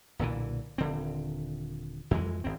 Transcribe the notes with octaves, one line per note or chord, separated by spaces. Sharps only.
B1 A#2 D3 E3
D#1 D3 C4
F2 E3 G#3
G#1 C4